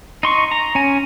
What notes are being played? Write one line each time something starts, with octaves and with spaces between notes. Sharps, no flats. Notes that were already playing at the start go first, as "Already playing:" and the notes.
D#4 C6 C#6
A#5
C#4 G#5